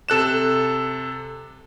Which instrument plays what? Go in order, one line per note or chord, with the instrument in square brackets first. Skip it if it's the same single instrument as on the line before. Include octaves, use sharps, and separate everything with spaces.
[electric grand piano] C3 A4 F#6 E7